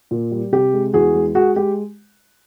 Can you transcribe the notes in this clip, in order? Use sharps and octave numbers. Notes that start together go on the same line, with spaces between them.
A#2
G3
C3 G4
G#3
E2 F#4 G#4
G#3
G#3 F#4 G#4
G#3 G4